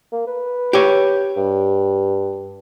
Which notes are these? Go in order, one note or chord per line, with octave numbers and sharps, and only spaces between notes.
A#3
B4
G4 C#5
G2